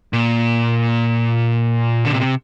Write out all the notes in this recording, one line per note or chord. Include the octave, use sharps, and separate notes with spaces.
A#2
D3
C3